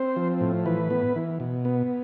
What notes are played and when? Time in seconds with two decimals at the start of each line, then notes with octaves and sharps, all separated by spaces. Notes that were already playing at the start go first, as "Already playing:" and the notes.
Already playing: C4 C5
0.16 F3
0.41 A2
0.66 E3 B4
0.90 B3
1.16 E3
1.40 B2
1.65 B3